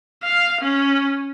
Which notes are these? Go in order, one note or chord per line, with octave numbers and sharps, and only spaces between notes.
F5
C#4